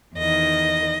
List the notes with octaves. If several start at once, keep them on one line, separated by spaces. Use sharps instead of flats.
E2 D#3 D#5